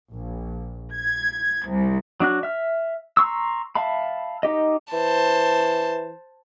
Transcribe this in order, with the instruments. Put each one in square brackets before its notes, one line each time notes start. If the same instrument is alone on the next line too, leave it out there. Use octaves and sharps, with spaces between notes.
[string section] A#1
G#6
C2
[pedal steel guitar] F#3 D4 F#4 F#6
E5 F6
A#5 C6 C#6 E6
E5 F5 A5 B5
D#4 G4 D#5
[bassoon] E3 [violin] C5 A5